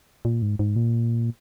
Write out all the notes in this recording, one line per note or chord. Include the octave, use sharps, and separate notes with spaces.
A#2
G#2
G#2
A#2